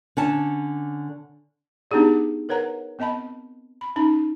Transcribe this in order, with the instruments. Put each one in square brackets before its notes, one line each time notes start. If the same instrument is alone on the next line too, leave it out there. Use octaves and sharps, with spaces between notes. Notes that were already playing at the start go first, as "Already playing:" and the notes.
[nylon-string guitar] D3 C#4 A5
[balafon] B3 D4 D#4 G4 G#4 D5
A#4 B4 C#5 F#5 A#5
B3 C4 D#5 A5 B5
B5
C#4 D#4 B5